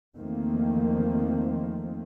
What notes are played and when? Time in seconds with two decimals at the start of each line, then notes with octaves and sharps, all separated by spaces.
0.16 E2 D#3 F3 A3 A#3 C4